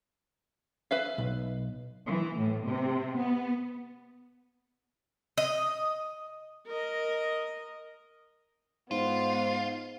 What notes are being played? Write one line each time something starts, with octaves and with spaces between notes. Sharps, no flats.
B4 E5 F5
B1
E3
A2
C3
B3
D#5
A#4 D#5
G#2 B3 F4 C5